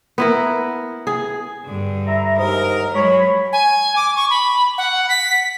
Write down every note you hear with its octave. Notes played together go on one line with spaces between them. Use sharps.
B3 E4 A#4
G#4
G2 D3
E4 E5 A#5
D#2 G#2 A#4 D#5
F#3 G#3 C#5 B5
G#5
D6
C#6
B5
F#5
B6